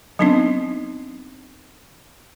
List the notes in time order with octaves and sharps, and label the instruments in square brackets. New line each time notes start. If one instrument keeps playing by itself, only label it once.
[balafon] F#3 B3 C4 D4 D#4